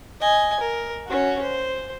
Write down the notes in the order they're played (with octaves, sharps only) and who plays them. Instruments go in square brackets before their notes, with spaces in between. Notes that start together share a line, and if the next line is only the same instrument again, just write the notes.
[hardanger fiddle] D#5 G#5
A#4
C#4 F#4
C5